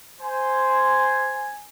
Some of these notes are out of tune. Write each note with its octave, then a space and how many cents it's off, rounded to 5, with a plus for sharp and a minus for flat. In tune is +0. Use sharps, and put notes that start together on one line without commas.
C5 -5 G#5 +0